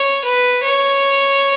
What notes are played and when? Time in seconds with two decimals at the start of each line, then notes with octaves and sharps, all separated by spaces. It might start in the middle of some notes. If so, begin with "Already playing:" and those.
Already playing: C#5
0.24 B4
0.63 C#5